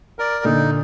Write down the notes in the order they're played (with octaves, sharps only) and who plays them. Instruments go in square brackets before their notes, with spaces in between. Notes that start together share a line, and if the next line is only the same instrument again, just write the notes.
[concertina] A#4 D5
[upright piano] A#2 D3 [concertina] D#4